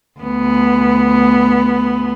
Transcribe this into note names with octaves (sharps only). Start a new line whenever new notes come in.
D2 B3